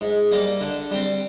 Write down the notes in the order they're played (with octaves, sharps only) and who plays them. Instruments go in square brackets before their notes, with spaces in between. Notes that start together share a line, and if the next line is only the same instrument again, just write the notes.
[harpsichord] G#2
G3 A#3
D3
G3 C4